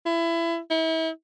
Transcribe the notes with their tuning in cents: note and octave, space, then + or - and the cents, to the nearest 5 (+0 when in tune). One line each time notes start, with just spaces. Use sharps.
E4 +25
E4 -35